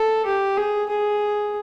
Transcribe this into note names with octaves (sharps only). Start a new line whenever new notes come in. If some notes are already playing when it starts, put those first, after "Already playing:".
Already playing: A4
G4
G#4
G#4